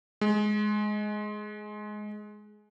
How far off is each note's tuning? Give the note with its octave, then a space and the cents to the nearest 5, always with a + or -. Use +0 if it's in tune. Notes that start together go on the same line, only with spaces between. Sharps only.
G#3 +15